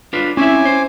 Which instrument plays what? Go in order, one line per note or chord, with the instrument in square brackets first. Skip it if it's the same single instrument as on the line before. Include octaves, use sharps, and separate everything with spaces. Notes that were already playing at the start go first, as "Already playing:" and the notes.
[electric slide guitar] D4 F4 B4
[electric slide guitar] C4 E4 E5 [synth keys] C#4 [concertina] G#5 D6
[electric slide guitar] C5